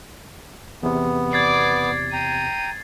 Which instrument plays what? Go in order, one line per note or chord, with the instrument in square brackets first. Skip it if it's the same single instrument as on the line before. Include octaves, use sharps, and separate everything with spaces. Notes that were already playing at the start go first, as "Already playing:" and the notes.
[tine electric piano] E2 C3 [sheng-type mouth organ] B3
[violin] D5 D6 [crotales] G#6 A6 C7
[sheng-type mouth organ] G5 A#5 [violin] D#7